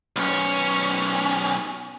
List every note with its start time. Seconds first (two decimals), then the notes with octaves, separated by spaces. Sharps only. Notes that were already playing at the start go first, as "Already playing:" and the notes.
0.16 B1 C#4